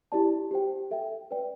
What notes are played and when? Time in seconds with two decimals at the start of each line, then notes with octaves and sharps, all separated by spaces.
0.12 E4 G4 D5 A5
0.51 G4 C5 G5
0.91 A4 E5 G5
1.31 B4 D5 G5